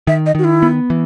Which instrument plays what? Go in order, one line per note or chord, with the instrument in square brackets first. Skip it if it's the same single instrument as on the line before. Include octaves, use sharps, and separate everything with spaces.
[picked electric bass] D#3 [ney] E5
[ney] D#5
[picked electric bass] D#3 [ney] F#4
[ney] E4
[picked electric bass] B3
E3